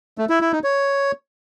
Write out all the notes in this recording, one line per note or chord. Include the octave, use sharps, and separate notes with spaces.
A3
E4
E4
D#4
C#5